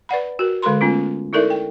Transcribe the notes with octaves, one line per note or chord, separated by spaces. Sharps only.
B4 D5 F#5 B5
F#4 A#4
D3 G#3 A4 A#4 B5 C6
A3 B3 C#4 F4
D#4 E4 A4 A#4 D5 E5
G5